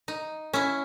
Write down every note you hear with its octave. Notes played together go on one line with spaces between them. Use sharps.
D#4
C#4 E4